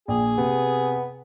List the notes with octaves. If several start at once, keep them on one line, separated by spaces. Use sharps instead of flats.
A#1 G#4
C3 B3